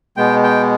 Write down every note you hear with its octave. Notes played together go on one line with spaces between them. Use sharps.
B2 G#3 B3 G5
G5